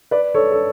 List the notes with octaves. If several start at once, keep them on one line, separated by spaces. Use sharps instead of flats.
B4 D5
A4 C#5
A4